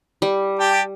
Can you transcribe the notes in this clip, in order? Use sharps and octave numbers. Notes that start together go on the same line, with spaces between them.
G3
G4 G5 A5